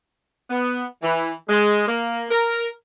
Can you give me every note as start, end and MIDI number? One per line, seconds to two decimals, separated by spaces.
0.49 0.84 59
1.02 1.31 52
1.49 1.85 56
1.87 2.24 58
2.30 2.66 70